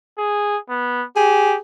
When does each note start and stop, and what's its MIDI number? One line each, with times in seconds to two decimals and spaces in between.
0.18 0.57 68
0.70 1.04 59
1.16 1.57 67
1.16 1.58 68